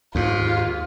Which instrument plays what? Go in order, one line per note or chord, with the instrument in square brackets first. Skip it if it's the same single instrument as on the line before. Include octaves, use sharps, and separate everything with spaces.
[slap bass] D#2 G#2 [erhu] F4